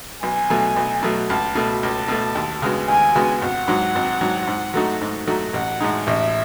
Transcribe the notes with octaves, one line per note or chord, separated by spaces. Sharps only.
B1 G#5
B2 F#3 A3
B1
B2 F#3 A3
C#2 A5
B2 A3
C#2 A5
B2 A3
D#2
C#3 G#3 B3 F#4
D#2 G#5
C#3 G#3 B3 F#4
G#1 F#5
G#2 F#3
G#1
G#2 F#3
G#2
F#3 A3 D#4 F#4
G#2
F#3 A3 D#4 F#4
A1 F#5
A2 G#3 D#4
A1 E5